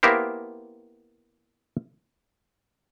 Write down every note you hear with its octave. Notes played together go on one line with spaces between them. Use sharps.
A#3 B3 E4 G4 A#4 C5